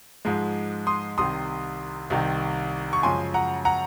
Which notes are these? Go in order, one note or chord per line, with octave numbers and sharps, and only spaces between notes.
G#2 F3 G#3
C6 D#6
C2 C3 D#3 C6 D#6
C2 C3 D#3
C#6
F#2 C#3 F3 G#3 G#5 C6
F#5 A#5
F#5 A#5